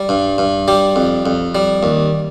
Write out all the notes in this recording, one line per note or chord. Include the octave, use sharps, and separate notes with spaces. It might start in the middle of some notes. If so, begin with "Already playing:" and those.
Already playing: G3
G2
G2
G3 G4
F2
F2
G3
D#2